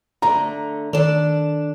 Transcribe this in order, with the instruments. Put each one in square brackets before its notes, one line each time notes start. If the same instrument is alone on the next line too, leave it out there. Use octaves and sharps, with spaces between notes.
[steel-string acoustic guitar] D3 A3 [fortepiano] A#5
[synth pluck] D#3 A4 E7 [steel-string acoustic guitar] D4 D5